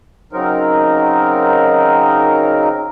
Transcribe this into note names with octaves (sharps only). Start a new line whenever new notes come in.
C#3 F#3 C4 D#4 A#4